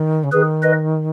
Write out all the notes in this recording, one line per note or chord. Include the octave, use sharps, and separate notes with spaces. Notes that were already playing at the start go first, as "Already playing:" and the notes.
Already playing: D#3
C#3
D#3 G#4 B4
B4 D#5